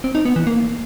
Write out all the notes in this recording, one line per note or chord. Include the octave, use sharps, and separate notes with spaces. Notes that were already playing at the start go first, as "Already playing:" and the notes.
C4
D#4
B3
E3
A#3